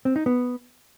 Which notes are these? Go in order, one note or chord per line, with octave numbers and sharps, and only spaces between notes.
C4
D#4
B3